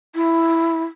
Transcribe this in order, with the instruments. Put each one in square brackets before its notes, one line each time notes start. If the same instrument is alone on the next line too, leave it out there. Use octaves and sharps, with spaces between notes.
[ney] E4